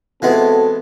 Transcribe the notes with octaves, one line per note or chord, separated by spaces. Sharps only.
E3 G#3 B3 C4 F#4 A4